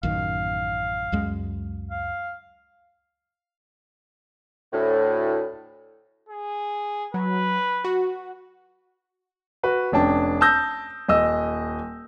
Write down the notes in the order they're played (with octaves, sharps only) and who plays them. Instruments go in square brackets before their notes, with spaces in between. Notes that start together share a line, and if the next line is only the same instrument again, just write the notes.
[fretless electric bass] A1 F#2 D#3 [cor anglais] F5
[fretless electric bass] C#2 F#2 G#3
[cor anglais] F5
[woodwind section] D2 A2
[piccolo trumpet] G#4
[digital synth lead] F#3 [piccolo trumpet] B4
[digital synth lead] F#4
[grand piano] F#4 B4
F1 C#4 D4 G5 A5
A5 D#6 E6 G6 A#6
D#1 D#5 E6